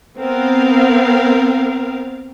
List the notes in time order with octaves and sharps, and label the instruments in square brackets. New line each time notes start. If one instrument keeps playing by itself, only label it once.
[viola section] B3 C4 A#4 F5